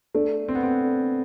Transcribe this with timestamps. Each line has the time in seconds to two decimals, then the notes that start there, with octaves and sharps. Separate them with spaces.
0.15 A3 D4 A4 D5
0.48 C4
0.55 B3
0.63 C4
0.81 D4 A4 D5